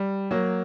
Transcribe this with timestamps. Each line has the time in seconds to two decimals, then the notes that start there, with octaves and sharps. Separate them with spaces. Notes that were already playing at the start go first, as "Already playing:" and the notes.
Already playing: G3
0.31 F#3 A#3